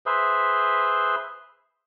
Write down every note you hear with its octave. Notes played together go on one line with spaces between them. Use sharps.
G#4 B4 C5 E5